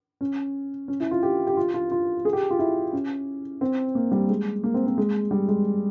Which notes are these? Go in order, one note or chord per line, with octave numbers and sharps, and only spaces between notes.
C#4
C#4
E4
F4
G4
G4
F4
F4
F4
G#4
G4
F4
E4
C#4
C4
A#3
G3
G#3
A#3
C4
C4
G#3
G3
G#3